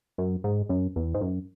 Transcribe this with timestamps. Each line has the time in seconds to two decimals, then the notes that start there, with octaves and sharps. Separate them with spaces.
0.18 F#2
0.44 G#2
0.69 F#2
0.96 E2
1.14 G#2
1.21 F#2